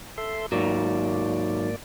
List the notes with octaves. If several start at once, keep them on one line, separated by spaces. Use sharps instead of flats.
A4 E5 C6
G#2 D#3 F#3 A#3 D5